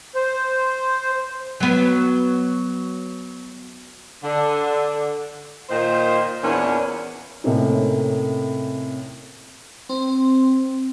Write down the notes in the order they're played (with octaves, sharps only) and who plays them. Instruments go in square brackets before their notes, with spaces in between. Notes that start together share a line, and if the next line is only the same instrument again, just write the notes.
[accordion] C5
[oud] F#3 B3
[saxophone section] D3
A#2 D#3 C5
E2 A#2 C#4 D4
[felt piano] A2 C3 A#3 C4 C#4 D#4
[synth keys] C4